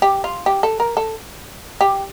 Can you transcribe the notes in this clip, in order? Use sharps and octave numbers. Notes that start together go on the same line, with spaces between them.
G4
F4
G4
A4
A#4
A4
G4